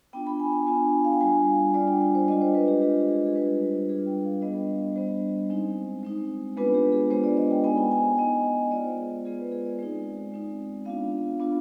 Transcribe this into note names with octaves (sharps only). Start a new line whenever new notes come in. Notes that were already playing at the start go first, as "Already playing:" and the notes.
B3 D4 F4 G5
B5
G#5
B5
B3 D4 F4 G#5
F5
G5
G3 D4 F4 G#5
G3 D4 F4 D5
G5
G5
C5
G#3 D4 F4 D#5
C5
B4
G4
G#3 D4 F4 G4
G#4
G#4
G3 D4 F4 B4
G3 D4 F4 G#4
G5
F5
G3 B3 D4 D#5
G3 B3 D4 C5
G#3 C4 D#4
G#3 C4 D#4
G#3 B3 D4 F4 B4
G4
G#4
G#3 B3 D4 F4 C5
D5
D#5
G5
B3 D#4 G#5
G5
G#5
G5
B3 D#4 D#5
D#5
G#3 B3 F4 D5
C5
G#4
G#3 B3 F4 G#4
B4
G#4
D5
G#3 C4 D#4
G#3 C4 D#4
B3 D4 F4 F5
B3 D4 F4